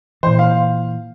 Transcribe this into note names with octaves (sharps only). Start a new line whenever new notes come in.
A#2 E3 C5
F5